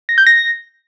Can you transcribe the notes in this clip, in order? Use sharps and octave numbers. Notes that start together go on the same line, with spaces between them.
A#6
G6
A#6